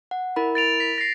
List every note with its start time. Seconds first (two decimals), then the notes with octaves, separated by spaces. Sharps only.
0.11 F#5
0.36 E4 A#4 B5
0.55 A6 D7 F7
0.80 B6
0.98 A#6 C7